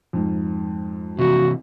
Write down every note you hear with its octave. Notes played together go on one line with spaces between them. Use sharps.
F2 G#2
C3 E3 F#4